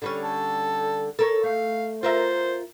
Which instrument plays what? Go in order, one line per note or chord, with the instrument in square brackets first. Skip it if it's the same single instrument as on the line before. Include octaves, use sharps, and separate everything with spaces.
[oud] D3 G3 C#4
[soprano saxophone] A4
[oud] A4 A#4 C#5
[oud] A3 [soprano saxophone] F5
[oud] F4 A#4 E5 [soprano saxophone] C5